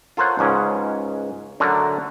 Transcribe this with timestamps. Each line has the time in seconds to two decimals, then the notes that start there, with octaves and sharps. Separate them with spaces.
0.17 F4 A4 A#4 C5 C#5 F#5
0.39 C#2 G#2 C#4
1.60 D3 F#3 A3 A4 A#4